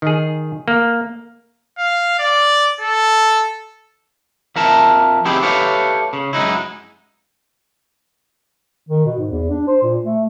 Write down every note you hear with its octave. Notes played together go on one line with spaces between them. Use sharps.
D#3 G#4
A#3
F5
D5
A4
F2 A#4 E5 A5
B3 C4 D#4 E4 G4 G#4
G4 A4 B4 C#5 E5 F5
C#3
F#2 G#3 D#4 E4
D#3
B2
G#2
E2
D4
C5
A#2
A3